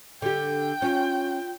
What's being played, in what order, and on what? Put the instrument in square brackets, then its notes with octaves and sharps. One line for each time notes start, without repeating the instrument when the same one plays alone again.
[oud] D3 G4 [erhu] G5
[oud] C#4 [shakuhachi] F4